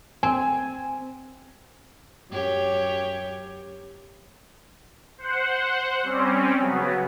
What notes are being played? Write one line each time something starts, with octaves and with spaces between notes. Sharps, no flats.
C4 G#5
F#2 G4 C#5
C5 F#5
G3 C4 C#4
C#3 F#3 B3